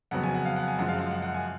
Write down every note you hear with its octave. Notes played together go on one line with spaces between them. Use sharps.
F2 C#3 F#3 B3 F#5
G#5
F#5
F5
F#5
G#5
F#2 F3 G#3 F#5
F5
F#5
F#5
F#5
G#5